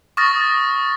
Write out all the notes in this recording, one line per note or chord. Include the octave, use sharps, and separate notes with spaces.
C#6 D#6 F6 A6 A#6